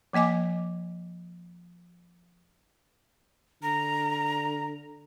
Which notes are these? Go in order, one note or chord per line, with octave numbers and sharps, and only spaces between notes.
F3 A#3 D#5 G#5 D6
D3 A#5